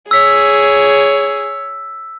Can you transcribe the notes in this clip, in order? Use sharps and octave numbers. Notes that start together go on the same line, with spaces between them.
G#4 C#5 E6 B6